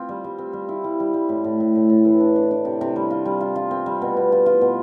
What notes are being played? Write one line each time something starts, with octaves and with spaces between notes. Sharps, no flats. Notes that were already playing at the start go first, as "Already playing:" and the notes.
Already playing: C4 F4
G3
G3
C4
G3
E4
G3
G3
G3
A2
A2
A2
A2
A2
E3
D4
D4
D4
C3
C3
G3
F4
G3
F4
F4
C4
G3
B2
B2
F4
F4
B2